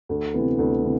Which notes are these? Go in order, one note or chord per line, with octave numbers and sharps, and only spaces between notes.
D2
C3 E3 B3
D2
C3 E3